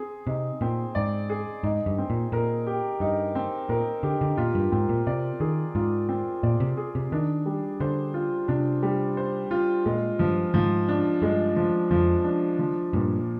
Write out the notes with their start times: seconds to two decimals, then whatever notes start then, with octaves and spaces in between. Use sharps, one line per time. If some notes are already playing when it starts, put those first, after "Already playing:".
Already playing: C4 G#4
0.27 C3 D#4
0.61 A#2 C4
0.95 G#2 D5
1.30 G#4
1.63 G#2 D#4
1.86 G2
1.98 C4
2.10 A#2
2.32 A#2 A#4
2.67 G4
3.00 G2 D#4
3.35 C4
3.69 A#2 A#4
4.03 D3 G4
4.21 D3
4.37 A#2 F4
4.55 G2
4.72 G#2 C4
4.89 A#2
5.07 C3 D5
5.40 D#3 G#4
5.75 G#2 F4
6.09 C4
6.43 A#2 D5
6.60 C3
6.77 G#4
6.95 C3
7.12 D#3 D4
7.46 G3
7.80 D3 C5
8.14 F4
8.48 C3 D4
8.83 G3
9.17 C5
9.51 F4
9.85 A#2 G#3
10.19 G2 F3
10.54 G#2 F3
10.89 D4
11.22 G2 G#3
11.56 F3
11.91 F2 F3
12.25 D4
12.59 F3
12.93 G2 A#2